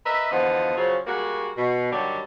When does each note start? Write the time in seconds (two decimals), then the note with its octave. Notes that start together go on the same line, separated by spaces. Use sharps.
0.06 A#4 B4 D#5 E5
0.31 E2 D3 F3 B3 F4 D#5
0.77 C#3 F3 F#3
1.07 G3 G#3 A#3 F#4
1.57 B2
1.91 G2 D3 D#3 F#3 G3